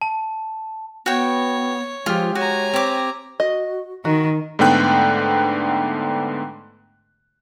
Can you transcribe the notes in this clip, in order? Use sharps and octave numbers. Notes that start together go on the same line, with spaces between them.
A5
B3 F#4 C#5 G5
F3 G#3 F4 G4
F#4 C#5 G#5 A#5
C4 G4 D6
F#4 D#5
D#3 D#4 F#4
G#2 D3 A3 B3 G5 F#6